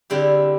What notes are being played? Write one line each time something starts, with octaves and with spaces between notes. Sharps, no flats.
D3 G3 C4 E4 G4